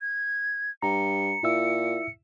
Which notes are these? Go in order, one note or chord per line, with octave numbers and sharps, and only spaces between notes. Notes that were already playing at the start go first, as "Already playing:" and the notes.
G#6
G2 A#5 C#7
A#2 E4 E5 E6